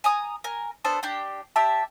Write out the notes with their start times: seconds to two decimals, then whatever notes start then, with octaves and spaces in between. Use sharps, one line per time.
0.04 G#5 A#5 D#6
0.44 A#4 G#5
0.85 B3 D4 A4 C5
1.03 D4 G4 G5
1.56 G4 E5 G5 A5